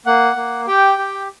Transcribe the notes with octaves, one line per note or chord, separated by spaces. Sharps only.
A#3 F#5
A#3
G4 G5
G4